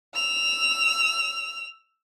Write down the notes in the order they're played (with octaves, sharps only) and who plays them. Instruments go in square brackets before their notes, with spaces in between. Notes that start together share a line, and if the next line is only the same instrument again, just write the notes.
[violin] E6 F7